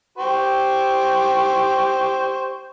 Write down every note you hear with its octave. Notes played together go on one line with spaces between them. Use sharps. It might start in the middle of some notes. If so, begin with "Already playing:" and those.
G4 C5 C#6